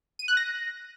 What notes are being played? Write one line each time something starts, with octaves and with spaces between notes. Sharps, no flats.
D#7
F#6
A#6